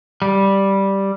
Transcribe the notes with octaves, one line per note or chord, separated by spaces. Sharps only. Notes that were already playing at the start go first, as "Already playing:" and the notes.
G3